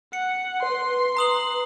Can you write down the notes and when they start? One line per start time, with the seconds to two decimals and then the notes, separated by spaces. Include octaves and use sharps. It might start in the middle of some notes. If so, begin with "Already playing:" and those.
0.13 F#5 C#7
0.62 B4 C6
1.17 A#5 D#6 F#7